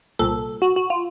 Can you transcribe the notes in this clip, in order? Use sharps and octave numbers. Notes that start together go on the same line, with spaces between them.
C2 A#2 A4
F#4
F#4
F4